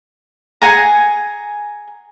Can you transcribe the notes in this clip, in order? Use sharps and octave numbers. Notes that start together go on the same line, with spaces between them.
G#4 F#5 G#5 A#5